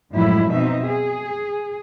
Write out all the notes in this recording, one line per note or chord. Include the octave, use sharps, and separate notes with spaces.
F#2 A2 F3 F#3 G#3 E4
B2 C4 D#4 E5
G#4